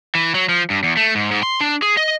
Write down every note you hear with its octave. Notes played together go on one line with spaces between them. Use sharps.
E3
F#3
F3
G2
E2
A3
G#2
G#2
C6
D4
G#4
D#5